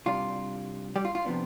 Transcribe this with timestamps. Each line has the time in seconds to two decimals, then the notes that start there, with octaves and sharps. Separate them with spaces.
0.06 C2 C3 G3 D4 F4
0.96 G3 G4
1.05 F4
1.15 F4
1.25 C3 F3 B3 D4